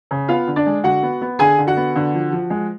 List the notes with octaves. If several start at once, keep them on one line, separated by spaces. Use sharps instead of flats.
C#3
B3 F4 F5
D3
D4 D5
G#3
D3 F#4 F#5
B3
B3
D3 G#4 G#5
D3
F#4 F#5
B3
D3
F3
F3
G#3